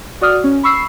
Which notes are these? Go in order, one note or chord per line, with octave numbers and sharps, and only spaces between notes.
F#4 D5 D#6 F6
C#4
B5 C#6 E6 C7